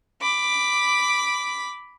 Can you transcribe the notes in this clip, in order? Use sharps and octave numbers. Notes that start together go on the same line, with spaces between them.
B5 D6